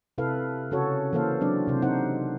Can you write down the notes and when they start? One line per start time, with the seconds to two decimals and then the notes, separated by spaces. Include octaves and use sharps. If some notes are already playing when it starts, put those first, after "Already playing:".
0.18 C3 E4 A4 B4 F5
0.71 C#3 C#4 F#4 A4 C#5
1.13 E3 A#3 A4 C5 F5
1.41 F#3 C4 D4 D5
1.68 C3 C5
1.82 D#4 C5 F#5